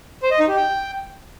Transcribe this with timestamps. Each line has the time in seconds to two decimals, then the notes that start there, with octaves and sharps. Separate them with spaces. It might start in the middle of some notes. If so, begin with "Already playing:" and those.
0.23 C5
0.31 D#5
0.40 D#4
0.48 G4
0.57 G5